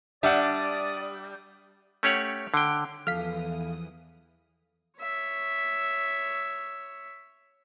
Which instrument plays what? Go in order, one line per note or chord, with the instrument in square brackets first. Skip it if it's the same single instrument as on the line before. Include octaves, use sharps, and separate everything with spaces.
[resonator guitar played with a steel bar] G3 D4 [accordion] D5 D#6 [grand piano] E5 F#5
[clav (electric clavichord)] A3 C#4 G4 C#5 F#5
D3 G5
[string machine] E2 E3 D#6 [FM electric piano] F3 [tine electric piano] A4 F5 [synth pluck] F6 B6
[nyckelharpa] C#5 E5